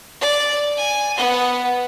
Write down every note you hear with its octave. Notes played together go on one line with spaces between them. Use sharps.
D5
G#5
B3 F#5